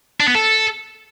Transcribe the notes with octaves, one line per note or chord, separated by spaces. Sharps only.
D4
B3
A4